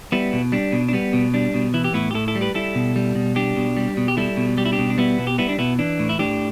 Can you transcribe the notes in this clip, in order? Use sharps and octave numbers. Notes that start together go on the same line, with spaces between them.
G3 B3 E4
B2
G3 D4
B2
D4
G3 B3
B2
G3 D4
B2
E3 E4
G4
A2 B3 E4
G4
A2 E4 A4
E4 A4
G3
G4 B4
G3 E4 A4
B2
G3
B2
G3 D4 G4
B2
G3
B2
G4
G3 E4 A4
B2
G3 G4
E4
D4 G4
B2
D4
G3 B3 E4
B2
G4
G3 B3 E4
D4
B2 B3 E4
E3 D4
A2
E4
A2 D4 G4